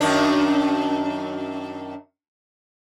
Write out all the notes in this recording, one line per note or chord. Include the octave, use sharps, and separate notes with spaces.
F#2 D#3 D4